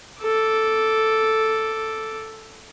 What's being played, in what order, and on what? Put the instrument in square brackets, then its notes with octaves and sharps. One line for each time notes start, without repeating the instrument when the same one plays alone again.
[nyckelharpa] A4 D6